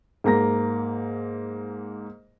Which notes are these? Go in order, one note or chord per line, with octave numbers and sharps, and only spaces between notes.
G#2 A#3 A#5 A#6